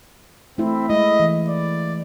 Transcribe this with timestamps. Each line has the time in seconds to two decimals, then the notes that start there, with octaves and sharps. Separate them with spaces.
0.58 A3 C4 E4
0.90 G#3 E4 D#5
1.20 E3
1.49 D5